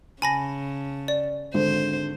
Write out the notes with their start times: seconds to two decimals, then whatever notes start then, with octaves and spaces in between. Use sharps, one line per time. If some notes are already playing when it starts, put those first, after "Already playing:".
0.22 C#3 G#5 A5 B5 A#6
1.08 D5
1.54 G#1 G#2 D3 C5